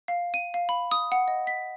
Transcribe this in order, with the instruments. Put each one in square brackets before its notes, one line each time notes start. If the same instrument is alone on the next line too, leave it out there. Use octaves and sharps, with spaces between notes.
[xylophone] F5
D#7
F5
B5
D#6
F#5
D#5
B6